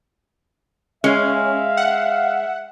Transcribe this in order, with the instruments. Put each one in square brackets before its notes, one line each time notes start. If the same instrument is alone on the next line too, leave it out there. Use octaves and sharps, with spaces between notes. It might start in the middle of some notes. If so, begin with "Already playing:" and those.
[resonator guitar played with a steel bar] G#3 [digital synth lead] C#4 [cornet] E5 [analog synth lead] F5
[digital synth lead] F#5